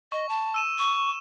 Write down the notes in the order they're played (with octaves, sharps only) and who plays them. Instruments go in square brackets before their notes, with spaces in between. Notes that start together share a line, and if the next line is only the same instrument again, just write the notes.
[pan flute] D#5 [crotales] C#6
[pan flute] A5
[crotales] E6 D#7 E7
[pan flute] C#6